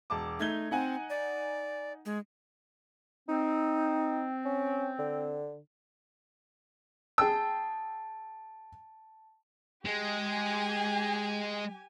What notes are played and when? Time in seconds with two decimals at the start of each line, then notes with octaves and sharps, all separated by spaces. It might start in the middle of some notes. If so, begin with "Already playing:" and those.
0.10 E1 A5 D6
0.40 A3 D#4 G#6 G7
0.71 C4 D#4 F#5 G#5
1.10 D5
2.06 G#3
3.29 C4 D#4
4.46 C#4
4.99 D3
7.18 G#4 G5 A5 E6
9.85 G#3 G4 G#5